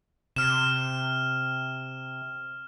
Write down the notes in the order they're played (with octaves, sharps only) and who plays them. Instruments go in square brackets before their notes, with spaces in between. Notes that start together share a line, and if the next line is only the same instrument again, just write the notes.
[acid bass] C3 [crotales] F6 E7